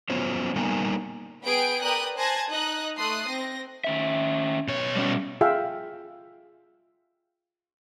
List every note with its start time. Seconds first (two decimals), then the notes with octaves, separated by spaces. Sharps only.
0.10 F#3 B3 C#4 F4 C5
0.56 G3 A#3 B3 D#4 A#4 G#5
1.43 B3 G#4 B4 G5 D7
1.82 A#4 B4 D5 G5 D#6 F#6
2.17 C5 G#5 A5 F#6 G#6 A#6
2.48 D#4 D#5 D#6 F#6
2.99 A3 C6 D#6 F#6
3.28 C4 A#6
3.84 D#3 C#4 E5
4.68 B2 C#5
4.96 G3 C#4
5.41 F4 G#4 E5 F5 G5